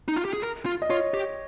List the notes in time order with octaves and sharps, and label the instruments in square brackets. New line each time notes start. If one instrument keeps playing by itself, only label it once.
[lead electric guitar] D#4
F4
G4
G#4
A#4
F4
[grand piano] D#5
[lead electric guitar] F4 [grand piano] C#5
[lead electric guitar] G4